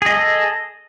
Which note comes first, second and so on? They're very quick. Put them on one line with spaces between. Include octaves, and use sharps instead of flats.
G#4 D#5 A4